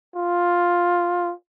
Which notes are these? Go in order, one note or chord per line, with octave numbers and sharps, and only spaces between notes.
F4